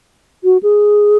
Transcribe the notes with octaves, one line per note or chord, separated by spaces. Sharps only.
F#4
G#4